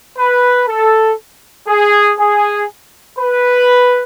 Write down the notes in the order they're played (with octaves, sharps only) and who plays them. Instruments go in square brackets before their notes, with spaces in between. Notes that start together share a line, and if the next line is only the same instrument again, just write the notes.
[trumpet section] B4
A4
G#4
G#4
B4